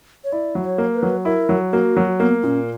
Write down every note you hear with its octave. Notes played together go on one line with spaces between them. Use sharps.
C#5
E4 D5
F#3
C#5
A#3
B4
F#3
E4 A#4
F#3
A#3 F#4
F#3
A#3 B3
A#2 C#4